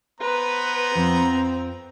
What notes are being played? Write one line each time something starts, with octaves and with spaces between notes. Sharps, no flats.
B3 B4 C5 A#5
F2 C4